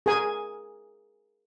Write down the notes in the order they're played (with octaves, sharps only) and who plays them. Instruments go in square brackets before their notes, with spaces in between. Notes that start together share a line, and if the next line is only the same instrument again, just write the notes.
[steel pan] G#4 A#4 G#5